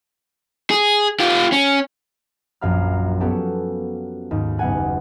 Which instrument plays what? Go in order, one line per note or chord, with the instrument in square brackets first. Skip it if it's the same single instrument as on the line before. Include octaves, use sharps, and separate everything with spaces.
[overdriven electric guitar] G#4
F4 G4
C#4
[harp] A#1 F#2 F5 B5 F6
B3 C#4 F#4 G4 A4
D#2 G#2
F#1 B3 F#5 G#5 F#6